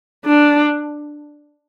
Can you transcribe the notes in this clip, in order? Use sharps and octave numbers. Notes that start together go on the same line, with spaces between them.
D4